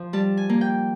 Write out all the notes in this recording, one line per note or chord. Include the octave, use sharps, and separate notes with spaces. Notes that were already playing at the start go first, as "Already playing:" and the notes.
Already playing: F3
G3 A5
G#5
A#3
G5